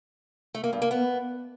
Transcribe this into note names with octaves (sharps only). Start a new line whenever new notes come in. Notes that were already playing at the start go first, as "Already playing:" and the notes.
A3
A#3
G2
A#3
B3